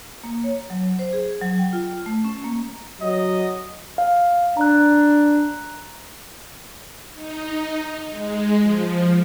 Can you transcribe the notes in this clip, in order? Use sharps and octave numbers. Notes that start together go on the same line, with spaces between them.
A#3
C#5
F#3
C5
G#4
F#3
G5
F4
A3
C#4
A#3
F#3 D#5
F5
D4 A#5 F#6
D#4
G#3
F3